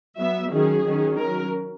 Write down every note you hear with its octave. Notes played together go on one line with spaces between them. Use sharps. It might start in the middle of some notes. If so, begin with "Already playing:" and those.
F#3 B3 E5
D#3 F#3 C#4 G#4
D#3 F#3 C#4
F#3 C#4 A#4